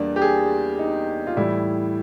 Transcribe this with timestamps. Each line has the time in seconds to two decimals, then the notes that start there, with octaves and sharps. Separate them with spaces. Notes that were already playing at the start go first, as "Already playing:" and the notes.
Already playing: E2 G3 A#3 D4
0.16 G4
0.22 G#4
0.79 D#4
1.27 F4
1.37 A2 E3 G3 E4